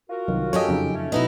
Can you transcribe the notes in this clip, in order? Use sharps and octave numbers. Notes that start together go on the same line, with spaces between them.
F4 F#4 A#4
C2 D#3 F#3
F#2 G4 A4 C#5 D#5 G#5
F2 C#3 D#4
A3 C#4
B2 B3 D#4 E4 B4 D#5